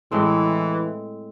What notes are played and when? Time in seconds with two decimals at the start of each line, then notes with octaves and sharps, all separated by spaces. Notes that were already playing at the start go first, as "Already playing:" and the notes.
0.11 A2 E3 G#3 C4